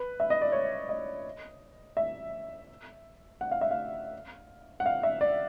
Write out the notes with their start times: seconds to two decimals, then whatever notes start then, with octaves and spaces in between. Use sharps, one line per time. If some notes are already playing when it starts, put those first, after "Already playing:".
Already playing: B4
0.20 E5
0.30 D#5
0.42 D5
0.52 C#5
0.89 D#5
1.97 E5
3.41 F#5
3.51 F5
3.61 E5
3.71 F5
4.80 F#5
4.86 F5
5.03 E5
5.21 D5